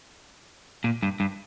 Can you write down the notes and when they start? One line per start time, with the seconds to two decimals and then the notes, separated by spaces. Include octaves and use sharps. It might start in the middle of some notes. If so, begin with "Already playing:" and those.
0.84 A#2
1.03 G2
1.20 G2